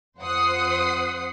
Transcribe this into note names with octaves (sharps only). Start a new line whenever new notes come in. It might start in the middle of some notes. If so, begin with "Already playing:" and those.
F2 C5 F#5 D#6 C7